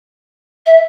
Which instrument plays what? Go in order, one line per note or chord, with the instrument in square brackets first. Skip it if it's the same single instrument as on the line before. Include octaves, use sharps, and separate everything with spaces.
[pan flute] E5